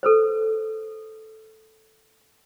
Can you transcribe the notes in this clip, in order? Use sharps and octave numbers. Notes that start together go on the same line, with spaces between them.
A4 B4 C5